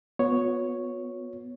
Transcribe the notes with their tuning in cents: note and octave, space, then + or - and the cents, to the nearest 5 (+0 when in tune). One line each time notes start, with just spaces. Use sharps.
B3 +0 F#4 -45 C#5 +0